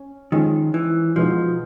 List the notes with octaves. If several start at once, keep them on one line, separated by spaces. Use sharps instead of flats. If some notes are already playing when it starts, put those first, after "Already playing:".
Already playing: C#4
D#3 F3 G#3 C#4
E3
B2 F3 G#3 B3 D#4 F#4